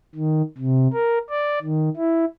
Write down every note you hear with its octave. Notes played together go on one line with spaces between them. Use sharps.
D#3
C3
A#4
D5
D#3
E4